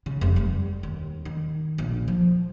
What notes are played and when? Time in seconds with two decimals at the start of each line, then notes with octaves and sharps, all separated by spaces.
0.06 C#3
0.21 F1
0.36 G3
0.83 D#2
1.25 D#3
1.78 A#1
2.08 F3